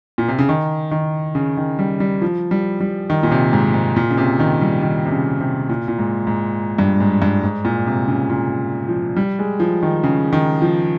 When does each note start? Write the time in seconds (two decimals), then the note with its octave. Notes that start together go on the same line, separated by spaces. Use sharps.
0.18 A#2
0.28 C3
0.39 C#3
0.49 D#3
0.91 D#3
1.35 C#3
1.57 D#3
1.79 G3
2.00 G3
2.22 F3
2.51 G3
2.80 G3
3.10 D#3
3.23 A#2
3.31 C3
3.53 G#2
3.74 G#2
3.96 A#2
4.11 C#3
4.17 C3
4.40 D#3
4.61 G3
4.82 D#3
5.05 C3
5.11 C#3
5.41 C3
5.69 A#2
5.88 A#2
5.99 G#2
6.27 G#2
6.78 G2
7.00 G#2
7.22 G2
7.43 G#2
7.65 A#2
7.87 C3
8.08 C#3
8.30 A#2
8.88 F3
9.16 G3
9.39 G#3
9.60 F3
9.83 D#3
10.04 C#3
10.33 D#3
10.62 F3